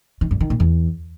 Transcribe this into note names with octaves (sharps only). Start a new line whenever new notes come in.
D#3
G2
D#3
A#2
E2